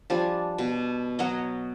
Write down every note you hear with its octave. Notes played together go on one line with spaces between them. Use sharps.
F3 G3 D4 G#5
B2
F#3 F#4 C#5 D#5